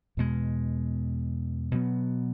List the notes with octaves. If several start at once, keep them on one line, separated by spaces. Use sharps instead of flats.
E2 B2 G#3
B2 F#3 B3